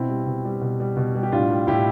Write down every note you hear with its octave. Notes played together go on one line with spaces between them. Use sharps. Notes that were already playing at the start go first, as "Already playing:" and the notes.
Already playing: B2 C4 E4
G3
B2
G3
B2
G3
B2
G3
G4
A2 D4 F4
G3
A2 E4 G4